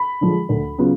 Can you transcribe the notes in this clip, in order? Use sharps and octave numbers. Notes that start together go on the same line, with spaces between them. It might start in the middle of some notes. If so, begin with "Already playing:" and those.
Already playing: B5
D3 F3 G#3
D2
C#3 F#3 B3 F4